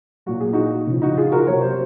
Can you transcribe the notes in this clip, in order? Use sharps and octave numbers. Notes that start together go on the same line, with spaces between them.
A#2 F#3 F#4
G#4
D#4 F#4
C#3 F3
D#4 F#4
F4 G#4
F#4 A#4
C3 F#3 C#5
C5